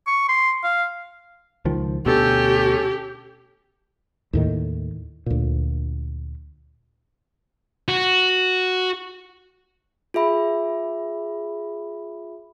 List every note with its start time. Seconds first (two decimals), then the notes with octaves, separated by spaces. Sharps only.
0.07 C#6
0.29 C6
0.64 F5
1.65 C#2 D#3 F3
2.06 D2 B2 C#4 G4 A4
4.33 D#2 A2 D#3
5.26 D2 A#2
7.88 F#4
10.14 F4 G#4 E5 B5